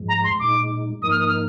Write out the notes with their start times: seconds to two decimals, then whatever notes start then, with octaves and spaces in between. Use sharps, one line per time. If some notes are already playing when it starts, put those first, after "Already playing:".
Already playing: G#2 F3 G#3
0.09 A#5
0.24 C6
0.39 A#2 G#3 D#4 D6
1.02 G#2 F3 A#3 D#4 A#4 D#6
1.11 F6
1.19 D#6
1.28 F6